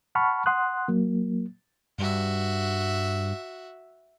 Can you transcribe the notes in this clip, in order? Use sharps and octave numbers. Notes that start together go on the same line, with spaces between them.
F#5 A5 B5 C#6 F6
F#5 C6 D#6 F#6
F#3 A#3
G2 F#4 E5